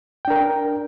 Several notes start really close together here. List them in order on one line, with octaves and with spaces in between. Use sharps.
G5 D4 A#4